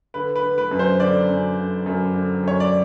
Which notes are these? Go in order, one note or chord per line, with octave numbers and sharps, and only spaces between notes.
D3 B4
B4
D3
B4
F#2
C5
D3 D5
F#2
D3
F#2
D3
F#2 C#5
D5